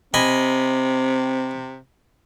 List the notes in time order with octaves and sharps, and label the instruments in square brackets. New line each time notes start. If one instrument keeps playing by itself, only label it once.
[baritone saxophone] C3 [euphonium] C4 [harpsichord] D#5 G#5 B5